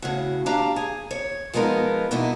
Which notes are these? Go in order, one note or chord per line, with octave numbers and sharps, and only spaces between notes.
A2 C#3 F#4
D4 G4 F5 A#5
G#4
C#5
F3 G#3 B3 D#4 A#4
G2 B2 E3 D#4 E4